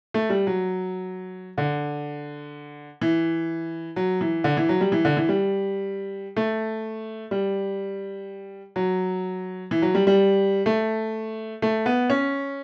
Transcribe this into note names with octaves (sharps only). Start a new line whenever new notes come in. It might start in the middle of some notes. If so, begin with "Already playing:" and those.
A3
G3
F#3
D3
E3
F#3
E3
D3
E3
F#3
G3
E3
D3
E3
G3
A3
G3
F#3
E3
F#3
G3
G3
A3
A3
B3
C#4